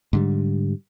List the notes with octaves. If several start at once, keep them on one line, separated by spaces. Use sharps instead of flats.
G#2 D3 G3